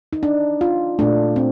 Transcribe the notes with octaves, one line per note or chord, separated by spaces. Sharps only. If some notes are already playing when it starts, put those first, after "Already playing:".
D#4
D4
F4
A#2 A3 D4
C4